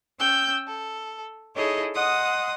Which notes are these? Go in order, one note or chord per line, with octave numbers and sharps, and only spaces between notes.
C#4 G5 E6 G6
A4
D#4 E4 G#4 A4 C#5 D#5
D#5 F#5 C6 D#6